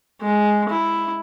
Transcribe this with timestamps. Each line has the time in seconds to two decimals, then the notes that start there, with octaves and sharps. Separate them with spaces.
0.22 G#3
0.69 E4